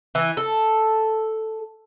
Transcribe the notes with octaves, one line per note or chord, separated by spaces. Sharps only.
E3
A4